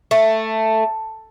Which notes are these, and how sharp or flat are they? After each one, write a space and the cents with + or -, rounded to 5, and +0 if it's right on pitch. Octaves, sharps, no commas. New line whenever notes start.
A3 +5